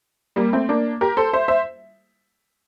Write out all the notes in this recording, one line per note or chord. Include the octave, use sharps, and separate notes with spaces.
G3 A#3
A3 C4
A#3 D4
G4 A#4
A4 C5
C5 E5
C5 E5